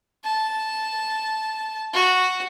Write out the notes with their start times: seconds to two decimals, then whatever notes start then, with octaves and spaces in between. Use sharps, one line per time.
0.24 A5
1.93 F#4